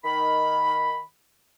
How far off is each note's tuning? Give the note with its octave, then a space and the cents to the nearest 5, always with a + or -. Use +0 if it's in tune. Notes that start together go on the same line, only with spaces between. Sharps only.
D#3 +0 B5 +0